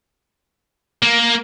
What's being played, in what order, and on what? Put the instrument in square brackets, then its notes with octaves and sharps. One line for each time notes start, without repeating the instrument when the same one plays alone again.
[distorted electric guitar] A#3